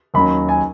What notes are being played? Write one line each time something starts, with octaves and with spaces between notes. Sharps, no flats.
D#2 D#3 F#3 C#4 B5
G#5